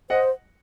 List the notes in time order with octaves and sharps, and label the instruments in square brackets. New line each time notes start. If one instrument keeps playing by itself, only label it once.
[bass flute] C5 [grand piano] D#5 F#5